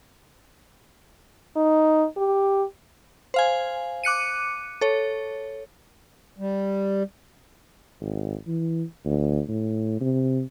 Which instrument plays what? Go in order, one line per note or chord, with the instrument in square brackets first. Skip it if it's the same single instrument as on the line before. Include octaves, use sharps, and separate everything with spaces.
[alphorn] D#4
G4
[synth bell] C5 F5 G#5
D6 F#6 C#7 D#7
A4 C#5
[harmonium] G3
[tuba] G#1
E3
D2
A2
C3